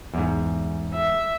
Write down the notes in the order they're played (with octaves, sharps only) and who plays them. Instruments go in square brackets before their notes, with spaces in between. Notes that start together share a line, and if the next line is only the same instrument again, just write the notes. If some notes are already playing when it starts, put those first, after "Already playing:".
[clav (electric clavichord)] E2 G#2
[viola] E5